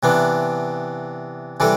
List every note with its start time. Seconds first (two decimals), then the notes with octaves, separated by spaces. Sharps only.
0.03 C3 E3 B3 D4
1.60 C3 E3 G3 D4 A4